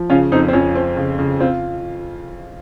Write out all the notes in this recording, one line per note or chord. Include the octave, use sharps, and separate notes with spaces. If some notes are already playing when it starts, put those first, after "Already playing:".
Already playing: F3
C#3 C#4 F4
F2 C4 D#4
C4
F2 C#4
C4
C#3
C#3
C4 F4